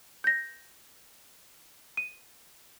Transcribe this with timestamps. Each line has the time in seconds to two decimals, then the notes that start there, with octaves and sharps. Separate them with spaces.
0.24 G6 A#6
1.97 D#7